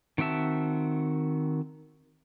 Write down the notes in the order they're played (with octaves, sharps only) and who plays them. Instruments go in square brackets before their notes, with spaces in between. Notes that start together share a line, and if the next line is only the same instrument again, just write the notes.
[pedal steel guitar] D#3 C4 F#4 E5 A5